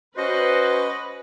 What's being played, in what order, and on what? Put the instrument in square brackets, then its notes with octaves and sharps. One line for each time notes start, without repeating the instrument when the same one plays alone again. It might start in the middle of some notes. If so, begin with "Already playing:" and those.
[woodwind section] C#4 F#4 C5 [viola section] B4 [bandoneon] D#5